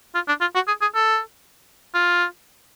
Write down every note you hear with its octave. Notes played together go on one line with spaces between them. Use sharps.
F4
D4
F4
F#4
G#4
G#4
A4
F4